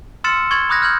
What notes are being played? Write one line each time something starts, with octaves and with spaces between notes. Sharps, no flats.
C6 E6 F6 A6 C#7 E7
C#6 G#6 A6 F#7
B5 C#6 D#6 F#6 G#6 A#6
F6 G6 G#6 F#7